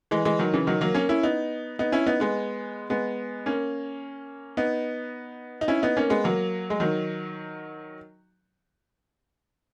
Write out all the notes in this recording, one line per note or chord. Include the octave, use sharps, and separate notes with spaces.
E3 G#3
E3 G#3
D#3 F#3
C#3 E3
D#3 F#3
F#3 A#3
A#3 C#4
C#4 E4
B3 D#4
B3 D#4
C#4 E4
B3 D#4
G#3 B3
G#3 B3
A#3 C#4
B3 D#4
D#4
C#4 E4
B3 D#4
A#3 C#4
G#3 B3
F#3 A#3
G#3
D#3 F#3